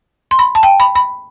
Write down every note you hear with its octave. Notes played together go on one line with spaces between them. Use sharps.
C6
B5
A5
G5
B5
B5